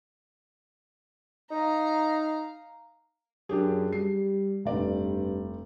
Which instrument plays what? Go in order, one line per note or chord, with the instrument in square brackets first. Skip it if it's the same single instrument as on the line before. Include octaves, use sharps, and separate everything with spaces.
[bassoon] D#4 [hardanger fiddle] F5 A#5
[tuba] F#2 [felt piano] D4 G4 G#4
[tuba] G3 [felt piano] C7
[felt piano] F1 D5 [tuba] G2